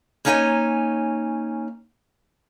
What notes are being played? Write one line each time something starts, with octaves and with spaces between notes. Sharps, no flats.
A#3 C#4 D#4 C#5 G5 G#5